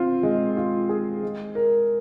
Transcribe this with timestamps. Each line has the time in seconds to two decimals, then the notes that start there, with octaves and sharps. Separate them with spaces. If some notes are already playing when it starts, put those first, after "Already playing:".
Already playing: C4 F4
0.23 G#3
0.57 F4
0.89 G#4
1.23 G#3
1.55 A#4